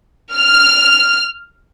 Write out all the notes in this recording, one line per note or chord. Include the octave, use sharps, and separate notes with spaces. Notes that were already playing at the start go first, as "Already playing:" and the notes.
F6